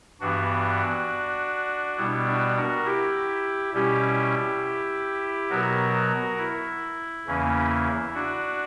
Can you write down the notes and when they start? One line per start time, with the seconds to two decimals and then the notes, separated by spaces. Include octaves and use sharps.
0.21 G2 E3 B3 D4 F#4
1.97 B2 G3 B3 E4
2.26 D4 F#4
2.56 F#4 A#4
2.85 E4 G4
3.73 B2 G3 C#4 E4 G4
5.50 B2 F#3 B3 F#4 A#4
6.38 E4
7.26 E2 C#3 E3 A#3 C#4
8.14 D4 F#4